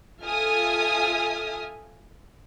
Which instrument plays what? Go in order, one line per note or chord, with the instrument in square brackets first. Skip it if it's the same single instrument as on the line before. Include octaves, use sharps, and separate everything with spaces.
[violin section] F4 A4 E5 G#5 D#6 F6